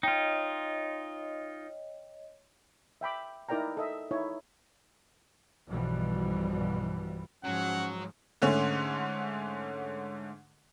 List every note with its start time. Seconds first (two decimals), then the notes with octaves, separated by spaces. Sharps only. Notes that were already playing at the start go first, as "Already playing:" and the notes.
0.03 D#4 F4 C#5 D#5 G5
3.01 E5 G5 B5 D6
3.49 D#4 E4 A#4 D5 G5 A#5
3.77 A4 D#5 E5
4.11 D#4 E4 C#5
5.68 B1 G2 B2 E3 F3 G3
7.44 G#2 F3 F#3 C#4 F#5
8.42 G#2 D3 A3 C#4